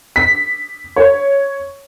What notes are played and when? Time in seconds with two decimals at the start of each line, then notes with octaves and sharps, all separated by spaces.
0.16 B6
0.96 C#5